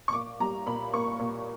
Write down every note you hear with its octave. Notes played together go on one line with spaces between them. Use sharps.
C#6
A#2 D6
G3 A#5
A#2 B5
A#3 C#6
A#2